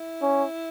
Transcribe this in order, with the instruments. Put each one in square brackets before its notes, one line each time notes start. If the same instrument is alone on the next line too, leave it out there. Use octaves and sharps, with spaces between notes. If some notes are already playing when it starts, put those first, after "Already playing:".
Already playing: [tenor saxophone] E4
[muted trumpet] C#4